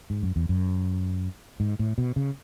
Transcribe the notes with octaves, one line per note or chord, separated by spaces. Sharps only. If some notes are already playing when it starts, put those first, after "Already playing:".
G#2
F#2
E2
F#2
G#2
A2
B2
C#3